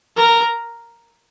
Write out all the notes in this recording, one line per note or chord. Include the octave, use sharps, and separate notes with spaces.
A#4